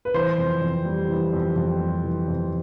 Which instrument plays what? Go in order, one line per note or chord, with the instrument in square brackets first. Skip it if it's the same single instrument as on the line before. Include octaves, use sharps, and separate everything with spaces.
[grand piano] B4
E3 C5
F2
F2
G3
E3
F2
F2
G3
E3
F2